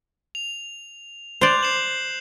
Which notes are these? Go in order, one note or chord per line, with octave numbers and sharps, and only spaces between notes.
F7
C5 D5 F#6 G6 F7
C7 E7 F#7